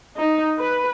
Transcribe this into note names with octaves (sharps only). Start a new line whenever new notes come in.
D#4
B4